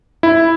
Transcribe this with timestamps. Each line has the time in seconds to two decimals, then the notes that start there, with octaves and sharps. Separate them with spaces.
0.23 E4